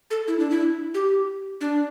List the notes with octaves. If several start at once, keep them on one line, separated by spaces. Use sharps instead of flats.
A4
E4
D4
E4
G4
D4